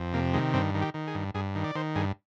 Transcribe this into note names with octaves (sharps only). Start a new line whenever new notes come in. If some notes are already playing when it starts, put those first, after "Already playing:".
Already playing: F2
C3 A#3
D#3 G#3
G2 C4
D#3
G4
D#3
G#4
G2
G2 G#4
D#3
D5
D#3 C5
G2 G#4